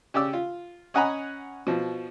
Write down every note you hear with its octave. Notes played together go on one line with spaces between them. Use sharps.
C#3 G4 D5 E6
F4
C#4 D#5 F#5 G#5 A#5 B5
B2 F3